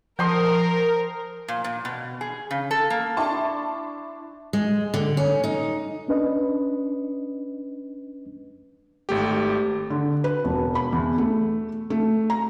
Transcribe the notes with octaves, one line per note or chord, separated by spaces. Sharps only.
F3 A#4 G5 C6 D#6
A#2
A#2
B2
G#4
C#3
A4
A#3
D4 E4 A5 C6 C#6
G#3
D3
C#4
D#4
C#4 D4 B4 D#5
G#1 A3 G4
D3
B4
E1
B5
E2
A3
A3
A#5